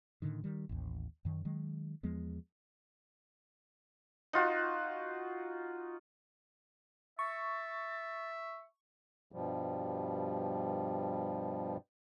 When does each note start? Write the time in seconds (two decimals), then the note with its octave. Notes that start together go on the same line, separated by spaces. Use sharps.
0.22 A2 D3 D#3
0.44 D#3 G3
0.69 A1 D#2
1.25 F#2 D#3
1.45 D#3 F#3 G#3
2.03 E2 F3 G#3 B3
4.33 D#4 F4 F#4
7.19 E5 C#6 A6
9.32 G2 B2 F3 G3